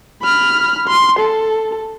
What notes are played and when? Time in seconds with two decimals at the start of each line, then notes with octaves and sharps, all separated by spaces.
0.22 B5 F6
0.88 C6
1.19 A4